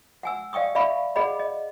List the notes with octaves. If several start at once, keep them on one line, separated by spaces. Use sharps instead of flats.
F#5 G#5 E6
D5 F5 G5 C#6 D#6
D5 E5 F5 B5 C#6
G#4 D5 D#5 F#5 B5
D#5